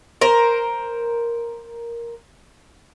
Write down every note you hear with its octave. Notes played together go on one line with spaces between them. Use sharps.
A#4 C5